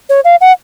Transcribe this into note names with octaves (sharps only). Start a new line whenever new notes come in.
C#5
F5
F#5